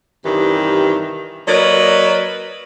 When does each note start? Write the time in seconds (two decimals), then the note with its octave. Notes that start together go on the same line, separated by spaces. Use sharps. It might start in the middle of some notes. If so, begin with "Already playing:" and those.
0.24 G2 C3 D#3 E3 G4
1.47 F#3 A#3 B4 D5 D#5